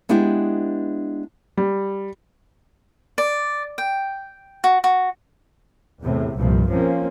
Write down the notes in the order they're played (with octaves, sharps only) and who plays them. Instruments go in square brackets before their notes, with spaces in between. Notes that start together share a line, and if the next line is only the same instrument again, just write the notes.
[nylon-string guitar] G#3 B3 D4 E4 G4
[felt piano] G3
[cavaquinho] D5
G5
F#4
F#4
[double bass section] E2 A2 C3
C2 G2 A#2 F3
F3 A#3 C4 C#4